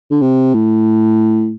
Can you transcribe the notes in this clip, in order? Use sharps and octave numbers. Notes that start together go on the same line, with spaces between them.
D3
C3
A2